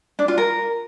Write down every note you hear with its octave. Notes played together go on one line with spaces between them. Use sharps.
D4
F4
A#4